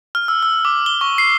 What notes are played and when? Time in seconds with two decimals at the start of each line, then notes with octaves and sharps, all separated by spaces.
0.15 F6
0.28 E6
0.43 E6
0.65 D6
0.86 G7
1.01 C#6
1.18 C7